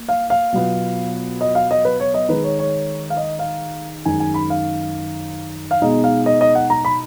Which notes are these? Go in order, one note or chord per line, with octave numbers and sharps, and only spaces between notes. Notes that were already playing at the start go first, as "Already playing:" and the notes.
Already playing: A#3
F5
F5
B2 F#3 B3 F4
D#5
F5
D#5
B4
C#5
D#5
D#3 G#3 D#4 B4
C#5
C#5
F5
D#5
F5
F#2 D#3 G#3 D#4 G#5
G#5
B5
F5
F5
B2 G#3 D#4 D#5
F5
D#5
D#5
F#5
A#5
B5